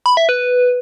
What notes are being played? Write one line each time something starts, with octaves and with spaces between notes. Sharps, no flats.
B5
E5
B4